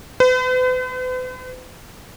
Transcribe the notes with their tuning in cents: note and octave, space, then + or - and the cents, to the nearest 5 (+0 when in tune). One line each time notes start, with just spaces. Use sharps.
B4 +45